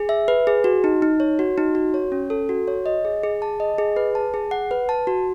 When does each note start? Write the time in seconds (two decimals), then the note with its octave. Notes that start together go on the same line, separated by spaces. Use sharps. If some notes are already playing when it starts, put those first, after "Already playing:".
Already playing: G#4
0.09 E5
0.28 B4
0.47 G#4
0.64 F#4
0.84 D#4
1.02 D#4
1.20 C#5
1.39 F#4
1.58 D#4
1.75 F#4
1.94 C#5
2.12 C#4
2.30 A4
2.49 F#4
2.68 C#5
2.86 D#5
3.05 G#4
3.23 G#4
3.42 A5
3.60 D#5
3.78 G#4
3.96 B4
4.15 A5
4.34 G#4
4.51 F#5
4.71 B4
4.89 A5
5.07 F#4